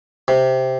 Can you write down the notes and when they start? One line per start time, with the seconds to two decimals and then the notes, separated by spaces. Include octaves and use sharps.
0.28 C3